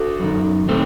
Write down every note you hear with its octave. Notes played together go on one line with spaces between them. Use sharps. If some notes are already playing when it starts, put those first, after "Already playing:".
Already playing: F#4 A4
F#2 D#3
A2 A3 C4